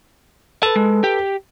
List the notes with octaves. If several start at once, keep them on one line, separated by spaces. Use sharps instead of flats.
A4 B4 A5
G#3
G4